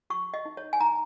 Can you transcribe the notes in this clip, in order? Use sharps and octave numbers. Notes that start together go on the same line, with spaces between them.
F#4 C#6
D#5
D#4
C#5
G#5
D#4 A#5